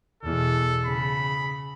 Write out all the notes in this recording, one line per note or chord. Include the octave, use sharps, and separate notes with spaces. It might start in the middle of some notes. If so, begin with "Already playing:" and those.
E2 B2 A4
C#3 B5